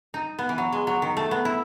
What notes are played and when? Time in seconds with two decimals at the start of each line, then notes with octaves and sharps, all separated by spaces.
0.14 D#4
0.39 B3
0.49 E3
0.58 F#3
0.72 G#3
0.87 F#3
1.02 D#3
1.17 A3
1.31 B3
1.45 E4